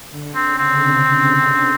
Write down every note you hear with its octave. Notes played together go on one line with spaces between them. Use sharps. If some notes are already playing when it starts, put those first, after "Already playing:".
D3
C4
C#3
C4
C3